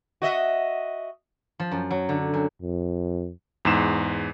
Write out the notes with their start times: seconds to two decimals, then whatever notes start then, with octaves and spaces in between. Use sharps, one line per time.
0.22 F#4 D#5 E5
1.60 F3
1.71 F#2
1.91 F#3
2.09 D3
2.34 F#2
2.62 F2
3.65 E2 G#2 E7